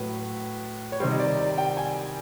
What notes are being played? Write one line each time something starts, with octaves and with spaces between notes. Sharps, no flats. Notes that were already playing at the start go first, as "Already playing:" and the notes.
Already playing: A2 F#3 B4
C#5
C3 D#3 G3 C5
D#5
D5
D5
G5
G#5